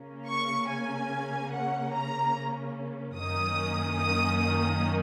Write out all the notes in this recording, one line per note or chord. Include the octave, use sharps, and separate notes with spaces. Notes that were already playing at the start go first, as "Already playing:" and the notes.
Already playing: C#3 A#3 C#4
C#6
G#5
F#5
A#5
F#2 D#3 A#3 C#4 D#6
D#6
D#6